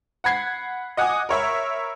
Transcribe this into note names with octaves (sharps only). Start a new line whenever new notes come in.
F#5 B5 G#6 C7
D#5 F#5 G#5 D6 D#6
A#4 C#5 E5 B5